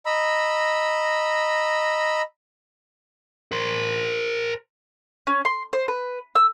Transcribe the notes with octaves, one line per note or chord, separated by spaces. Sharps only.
D#5 A#5 B5 E6
A#4 C5
C#4
C6
C5
B4
E6